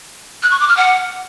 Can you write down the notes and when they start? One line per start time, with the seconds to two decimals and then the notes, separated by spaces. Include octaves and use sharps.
0.43 F#6
0.51 C#6
0.60 D6
0.68 F6
0.77 F#5